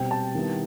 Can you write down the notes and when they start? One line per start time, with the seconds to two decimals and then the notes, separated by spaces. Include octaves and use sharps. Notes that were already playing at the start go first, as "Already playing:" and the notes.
Already playing: B2 G3 C4 G5
0.11 A5
0.35 D#3 G3 B3 E4